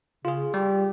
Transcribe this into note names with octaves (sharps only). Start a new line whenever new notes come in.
C#3 F4 G#4
G3 G4